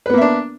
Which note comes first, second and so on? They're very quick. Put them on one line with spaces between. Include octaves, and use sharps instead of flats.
B4 B3 A#3 E5 D4